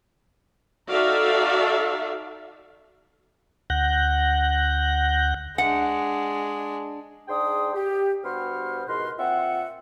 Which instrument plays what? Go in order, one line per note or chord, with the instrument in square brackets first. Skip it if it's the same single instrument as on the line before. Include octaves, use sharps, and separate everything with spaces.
[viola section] D#4 F#4 A4 D5 E5 F5
[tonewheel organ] D2 F#5 F#6 G6 A#6
[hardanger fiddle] G#3 D4 [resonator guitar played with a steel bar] F#5
[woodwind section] G#2 D4 G#4 G5 C6 D#6
G4
G2 B3 F#4 C5 C6 F6
E2 G#2 B2 A#4 B4 C6
A#2 C4 F4 E5 F#5